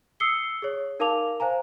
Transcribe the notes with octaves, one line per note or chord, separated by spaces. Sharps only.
D#6 E6 C7 C#7 G7
G#4 C#5
D#4 A#4 F5 A5 D6 F7
C5 F5 G#5 A#5